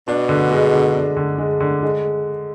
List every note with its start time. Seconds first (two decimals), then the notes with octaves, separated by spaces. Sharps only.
0.08 B2 D4
0.29 D3
0.51 G#3
0.73 D3
0.95 D4
1.17 D3
1.38 G#3
1.60 D3
1.83 G#3